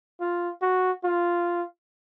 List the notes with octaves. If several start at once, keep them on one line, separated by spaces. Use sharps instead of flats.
F4
F#4
F4